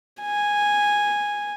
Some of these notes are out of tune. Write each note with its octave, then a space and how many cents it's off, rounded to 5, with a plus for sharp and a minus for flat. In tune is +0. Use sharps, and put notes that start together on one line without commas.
G#5 -10